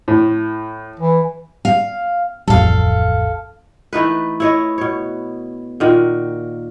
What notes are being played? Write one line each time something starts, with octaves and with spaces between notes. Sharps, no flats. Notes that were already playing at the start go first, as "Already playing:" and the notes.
A2
E3
F5
D1 A1 F2 A4 F5
E3 A3 D#4 B4
E4 C#5 D#5
B2 C#5
A#2 D#3 F#4